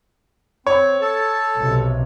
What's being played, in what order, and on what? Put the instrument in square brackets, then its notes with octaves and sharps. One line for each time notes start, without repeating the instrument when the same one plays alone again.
[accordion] C4 [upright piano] C#5
[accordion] A4 A5
[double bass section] B1 C3